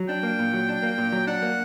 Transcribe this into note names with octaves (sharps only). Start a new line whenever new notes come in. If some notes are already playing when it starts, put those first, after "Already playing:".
Already playing: F#3
D4 G5
A#3
A#2
F#3
D4
A#3
A#2
F#3
D4 F#5
A#3